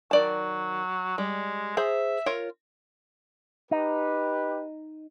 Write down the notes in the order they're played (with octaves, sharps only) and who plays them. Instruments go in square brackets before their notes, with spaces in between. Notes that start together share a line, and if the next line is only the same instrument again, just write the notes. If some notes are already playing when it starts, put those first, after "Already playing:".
[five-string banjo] D#3 D5 A5 [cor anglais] F#3
[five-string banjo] G3 [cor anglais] G#3
[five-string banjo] G#4 C5 A#5 [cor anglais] E5
[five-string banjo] F4 A#4 C#5
[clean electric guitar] D#4 [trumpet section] G4 B4